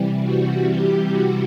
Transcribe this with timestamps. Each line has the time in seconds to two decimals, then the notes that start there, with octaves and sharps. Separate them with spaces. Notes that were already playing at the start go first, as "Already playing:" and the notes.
Already playing: C3 E3 G3
0.22 F#4
0.67 G4
1.12 F#4